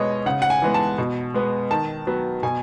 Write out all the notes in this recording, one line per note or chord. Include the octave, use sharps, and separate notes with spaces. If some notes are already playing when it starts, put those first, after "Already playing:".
Already playing: B2 G#3 B3 C#5 D#5
C#3 F#5
F#5
G#5
E3 G#3 B3
A5
B2
G#3 B3
D#3 A5
F#3 B3
B2 G#5